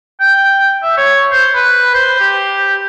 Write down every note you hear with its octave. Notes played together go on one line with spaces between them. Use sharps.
G5
E5
C#5
C5
B4
C5
G4